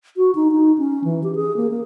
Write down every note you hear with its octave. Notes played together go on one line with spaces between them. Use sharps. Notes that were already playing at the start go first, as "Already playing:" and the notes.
F#4
D#4
D#4
C#4
E3
G4
G#4
A#3
A#3